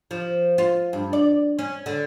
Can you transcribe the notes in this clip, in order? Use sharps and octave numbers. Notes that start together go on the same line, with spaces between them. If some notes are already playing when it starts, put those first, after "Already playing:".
F3
F4
G2
D5
C#4
D3